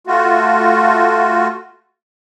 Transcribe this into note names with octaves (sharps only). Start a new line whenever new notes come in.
A3 F4 F#4